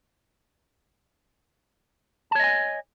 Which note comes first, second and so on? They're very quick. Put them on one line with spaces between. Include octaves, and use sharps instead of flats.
A5 C#5 D#5 G#5